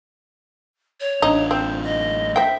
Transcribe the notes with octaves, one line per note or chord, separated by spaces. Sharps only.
C#5
A1 D4 D#4
C4 C5
D#5
C5 E5 G5